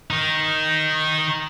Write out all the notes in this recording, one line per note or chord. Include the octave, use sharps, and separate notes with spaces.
D#3 D#4